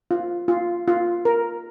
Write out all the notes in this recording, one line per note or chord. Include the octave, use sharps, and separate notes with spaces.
F4
F4
F4
A#4